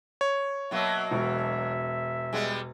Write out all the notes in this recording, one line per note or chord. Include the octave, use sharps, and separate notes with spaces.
C#5
B2 F#3 A#3 E5
E1 E5
G3 G#3 B3